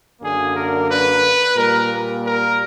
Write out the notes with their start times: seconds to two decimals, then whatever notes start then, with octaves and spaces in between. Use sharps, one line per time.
0.21 F#2 D3 F#3 A#3 G#4
0.55 A#4
0.89 B4
1.56 A#2 G3 A#3 A#4
2.25 A#4